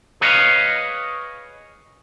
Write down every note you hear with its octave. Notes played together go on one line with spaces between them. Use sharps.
G#4 B4 C#5 D#5 F5